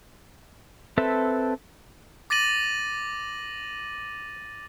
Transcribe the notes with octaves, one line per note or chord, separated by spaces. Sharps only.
C4 A4 B4 E5 A5
D6 A6 A#6 D#7 F#7